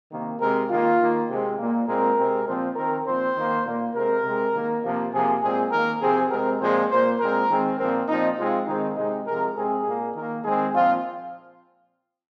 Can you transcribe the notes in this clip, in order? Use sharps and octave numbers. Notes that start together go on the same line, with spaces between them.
C3 D#3 A#3
C3 G#3 C4 A#4
D#3 A#3 F4
D#3 A#3
C3 G#3 C4
A#2 A#3
A#2 G#3 C4 A#4
C3 G#3 C4
A#2 F3 C4
D#3 C4 A#4
A#2 F3 C4 C5
D#3 A#3
A#2 A#3
C3 G#3 C4 A#4
C3 G#3 C4
D#3 A#3
C3 F3 A#3
C3 F3 A#3 G#4
A#2 G#3 C4 G#4
D#3 A#3 A#4
C3 F3 C4 G#4
C3 G#3 C4 A#4
A#2 F3 G#3 C4 C5
A#2 A#3 C5
A#2 G#3 C4 A#4
D#3 G#3 C4
A#2 F3 C4 A#4
A#2 F3 C4 D#4
C3 G#3 C4 F4
D#3 G#3 C4 D#4
C3 G#3 C4 D#4
C3 F3 G#3 A#4
C3 G#3 C4 G#4
A#2 A#3
D#3 A#3 A#4
D#3 G#3 C4 G#4
A#2 F3 C4 F4